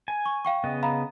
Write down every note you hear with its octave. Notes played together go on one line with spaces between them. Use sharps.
G#5
C#6
F5 G5 C#6
C#3 B3 D#5
F5 A#5 B5